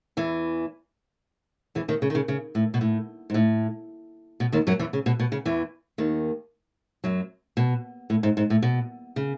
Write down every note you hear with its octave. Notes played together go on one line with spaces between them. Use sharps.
E2 E3
E2 E3
D#2 D#3
C#3
D#3
C#3
C#3
A2
B2
A2
G#2
A2
B2
D#2 D#3
F#2 F#3
E2 E3
C#3
B2
B2
C#3
E2 E3
D#2 D#3
F#2 F#3
B2
A2
G#2
G#2
A2
B2
C#3